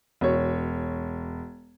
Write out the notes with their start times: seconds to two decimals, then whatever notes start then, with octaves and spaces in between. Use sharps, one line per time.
0.21 E1 C#5